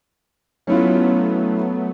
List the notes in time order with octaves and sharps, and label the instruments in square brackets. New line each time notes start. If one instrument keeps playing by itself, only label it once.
[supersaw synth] F#3 A3 B3 [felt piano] C#4 E4 F4